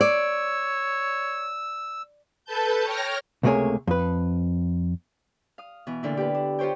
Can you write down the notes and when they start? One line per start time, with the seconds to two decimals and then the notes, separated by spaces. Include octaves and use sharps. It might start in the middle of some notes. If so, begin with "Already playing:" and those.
0.01 C#5 D5 E6
2.45 A4 B4 A5 G6
2.83 C#5 G5 F6 A#6
3.43 C#2 C3 A3 A#3 G#4 C#5
3.87 F2 B4
5.58 F5 D#6
5.87 B2 E3
6.03 A#2 D3 E4
6.17 G4 B4
6.35 D4
6.59 F4 G4 C5 C#5 G5